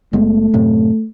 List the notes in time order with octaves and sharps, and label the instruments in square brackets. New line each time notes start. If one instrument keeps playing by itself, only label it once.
[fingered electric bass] F#1 G#3 B3 [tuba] A3
[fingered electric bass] F#2 A2 C3